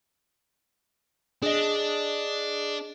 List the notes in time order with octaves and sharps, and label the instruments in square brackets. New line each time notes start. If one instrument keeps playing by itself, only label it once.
[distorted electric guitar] D4 [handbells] G#4 D#5